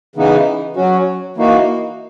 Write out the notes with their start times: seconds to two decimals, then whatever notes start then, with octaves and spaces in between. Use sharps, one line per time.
0.16 C#3 E3 B3 D#4
0.76 F#3 C#4 F#4
1.36 E3 A#3 D#4 F#4